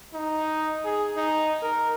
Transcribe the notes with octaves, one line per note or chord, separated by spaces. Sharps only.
D#4
G#4
D#4
A#4